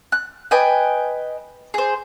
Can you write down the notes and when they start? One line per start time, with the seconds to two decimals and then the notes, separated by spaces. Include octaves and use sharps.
0.12 F#6
0.51 B4 D#5 G5 G#5
1.74 G#4 C5